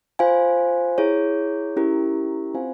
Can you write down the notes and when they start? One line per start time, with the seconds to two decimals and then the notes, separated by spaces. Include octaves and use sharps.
0.19 F4 C5 F5 G#5
0.98 E4 G#4 C#5
1.76 C#4 E4 G4 A#4
2.54 C4 F4 C5 F5 G#5